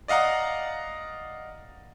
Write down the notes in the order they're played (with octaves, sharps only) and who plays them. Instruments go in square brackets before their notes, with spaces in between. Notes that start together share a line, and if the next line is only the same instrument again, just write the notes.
[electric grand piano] D5 D#5 F5 F#5 A#5